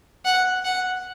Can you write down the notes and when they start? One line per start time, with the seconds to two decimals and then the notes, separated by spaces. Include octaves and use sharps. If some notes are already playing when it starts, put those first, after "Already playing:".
0.25 F#5
0.65 F#5